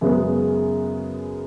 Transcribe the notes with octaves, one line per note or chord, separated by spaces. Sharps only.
F#2 C#3 G#3 B3